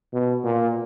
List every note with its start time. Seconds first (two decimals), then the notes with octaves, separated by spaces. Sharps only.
0.13 B2
0.44 A#2